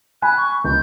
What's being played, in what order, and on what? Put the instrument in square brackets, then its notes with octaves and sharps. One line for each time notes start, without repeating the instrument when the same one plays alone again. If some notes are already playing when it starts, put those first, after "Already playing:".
[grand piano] G#5 B5 [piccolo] F#6
[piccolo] C#6
[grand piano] C#2 [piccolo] G6